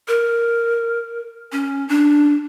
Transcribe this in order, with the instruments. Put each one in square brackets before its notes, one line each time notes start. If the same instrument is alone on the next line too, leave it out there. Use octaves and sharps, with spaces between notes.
[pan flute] A#4
C#4
D4